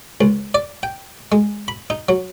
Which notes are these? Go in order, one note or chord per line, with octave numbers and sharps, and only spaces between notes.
C#2
D5
G5
G#3
B5
D#4
F#3